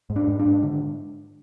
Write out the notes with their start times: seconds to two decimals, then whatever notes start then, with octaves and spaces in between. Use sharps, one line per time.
0.10 G#2
0.16 D4
0.28 G#2
0.39 D4
0.46 G#2
0.63 D3